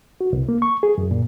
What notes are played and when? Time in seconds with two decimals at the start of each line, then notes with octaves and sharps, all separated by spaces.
0.21 F#4
0.33 C2
0.49 A#3
0.62 C#6
0.83 G#4
0.98 F#2
1.11 A#2